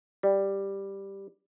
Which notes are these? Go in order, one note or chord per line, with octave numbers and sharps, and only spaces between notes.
G3